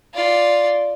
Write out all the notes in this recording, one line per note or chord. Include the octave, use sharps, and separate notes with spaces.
F4 D5